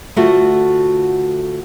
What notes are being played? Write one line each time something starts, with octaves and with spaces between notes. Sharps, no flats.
D2 A3 F4 F#4 F#5